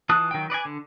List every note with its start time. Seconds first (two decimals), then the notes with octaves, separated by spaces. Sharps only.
0.09 E3 F4 A5 D#6 F#6
0.31 D#3 F#3 G5
0.50 B4 D5 D#5 G#5
0.65 D3